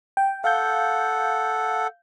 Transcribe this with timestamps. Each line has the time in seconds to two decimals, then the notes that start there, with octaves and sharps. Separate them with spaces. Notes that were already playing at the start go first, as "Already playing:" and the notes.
0.17 G5
0.44 A4 F5 F#5 G6